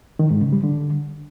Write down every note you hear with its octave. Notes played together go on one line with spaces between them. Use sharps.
D#3
G#2
C#3
G3
D3